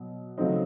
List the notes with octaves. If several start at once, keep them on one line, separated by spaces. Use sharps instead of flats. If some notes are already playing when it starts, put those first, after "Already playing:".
Already playing: B2 F#3
C#3 F#3 A3 C4 D#4